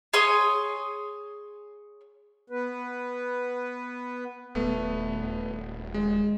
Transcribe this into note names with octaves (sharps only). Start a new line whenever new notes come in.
G#4 C#5 C6 D#6
B3 B4
D#1 A3 B3
G#3